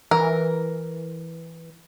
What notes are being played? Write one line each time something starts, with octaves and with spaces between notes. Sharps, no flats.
E3 A#4